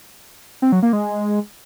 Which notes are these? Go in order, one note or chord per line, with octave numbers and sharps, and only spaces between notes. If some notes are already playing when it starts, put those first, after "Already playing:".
C4
F#3
A#3
G#3